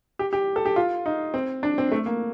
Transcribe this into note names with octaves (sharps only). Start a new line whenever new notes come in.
G4
G4
A4
G4
F4
D#4
C4
D4
C4
A3
A#3